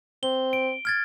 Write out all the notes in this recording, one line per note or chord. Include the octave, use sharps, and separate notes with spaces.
C4 G7
D7
F6 G#6 A6